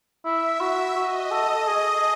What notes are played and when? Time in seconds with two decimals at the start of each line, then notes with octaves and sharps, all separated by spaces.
0.25 E4 E5
0.61 F#4
0.96 F#4 D#5
1.31 A4
1.49 A4
1.67 G#4 D#5